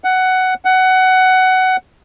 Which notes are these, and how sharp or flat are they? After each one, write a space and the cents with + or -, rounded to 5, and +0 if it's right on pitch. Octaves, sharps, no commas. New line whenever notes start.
F#5 +10
F#5 +15